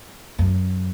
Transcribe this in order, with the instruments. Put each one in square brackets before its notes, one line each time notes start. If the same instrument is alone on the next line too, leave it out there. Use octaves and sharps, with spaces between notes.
[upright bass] F#2